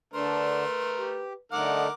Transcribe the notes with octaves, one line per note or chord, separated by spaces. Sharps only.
D3 A3 D4 A#4 B4 C6
G4
D3 A3 D#4 A#4 F#5 D6